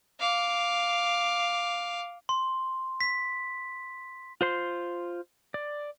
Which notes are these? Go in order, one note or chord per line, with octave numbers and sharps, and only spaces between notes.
F5 D6
C6
B6
F4 C5 C6
D5